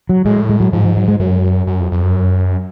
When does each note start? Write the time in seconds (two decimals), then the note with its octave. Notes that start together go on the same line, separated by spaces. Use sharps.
0.09 F#3
0.25 A2 G#3
0.49 G#3
0.60 F#3
0.73 G#2 F3
0.84 F3
0.97 F#3
1.08 G#3
1.20 F#2 F#3
1.67 F#2
1.80 F2
1.92 F2
2.03 F#2